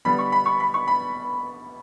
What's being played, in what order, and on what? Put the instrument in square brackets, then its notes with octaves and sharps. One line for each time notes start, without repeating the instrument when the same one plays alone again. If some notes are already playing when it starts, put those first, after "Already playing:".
[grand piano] D3 G3 B3 B5
C#6
B5
C#6
B5
C#6
B5